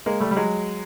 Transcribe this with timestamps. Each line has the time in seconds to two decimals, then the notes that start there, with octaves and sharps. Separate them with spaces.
0.06 G#3 A#3
0.20 G3 A3
0.31 G3
0.36 F#3 G#3